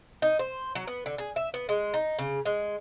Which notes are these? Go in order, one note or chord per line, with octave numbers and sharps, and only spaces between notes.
D#4
C5
F#3
B3
D3
G#4
E5
B3
G#3
D#4
C#3
G#3